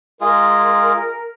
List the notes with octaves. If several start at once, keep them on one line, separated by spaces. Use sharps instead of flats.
G#3 F4 G#4 A#4